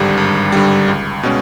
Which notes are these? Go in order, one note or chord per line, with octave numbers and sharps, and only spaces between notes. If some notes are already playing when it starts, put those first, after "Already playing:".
Already playing: G#1 G2 D3 G3
G#1
G2 D3 G3
C#2
B2 G#3 C#4